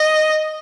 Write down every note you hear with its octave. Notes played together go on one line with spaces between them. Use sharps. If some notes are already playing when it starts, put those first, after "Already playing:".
Already playing: D#5